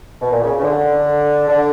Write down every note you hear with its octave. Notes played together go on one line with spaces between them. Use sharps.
B2
A#2
C#3
C#3
D3
D3